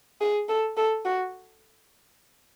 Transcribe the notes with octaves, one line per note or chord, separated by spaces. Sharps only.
G#4
A4
A4
F#4